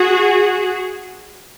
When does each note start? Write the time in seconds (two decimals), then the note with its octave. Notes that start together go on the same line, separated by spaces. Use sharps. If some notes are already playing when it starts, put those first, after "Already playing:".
Already playing: F#4 G#4